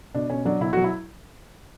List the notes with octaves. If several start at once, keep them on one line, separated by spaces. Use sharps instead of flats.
B2 D4
B2 C#4
F#3 D4
B2 E4
F#4
F#3
E4